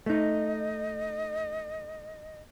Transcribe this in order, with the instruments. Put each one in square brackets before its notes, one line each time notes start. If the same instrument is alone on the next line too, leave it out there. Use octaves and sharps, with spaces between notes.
[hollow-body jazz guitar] A3 D#4 [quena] D#5